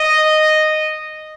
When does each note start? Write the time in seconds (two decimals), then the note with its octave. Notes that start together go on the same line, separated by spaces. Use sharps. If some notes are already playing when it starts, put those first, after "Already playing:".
Already playing: D#5